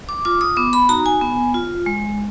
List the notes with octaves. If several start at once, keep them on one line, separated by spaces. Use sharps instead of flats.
D6
F4 D6
D#6
B3 D6
B5
D#4 F#4 A#5
G#5
B3
F4
G#3